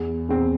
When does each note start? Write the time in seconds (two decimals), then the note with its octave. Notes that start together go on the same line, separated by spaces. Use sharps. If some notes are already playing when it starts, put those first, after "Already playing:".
Already playing: E2
0.29 E2 C4